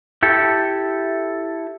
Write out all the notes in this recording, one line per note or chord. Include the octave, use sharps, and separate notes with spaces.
E4 G4 A4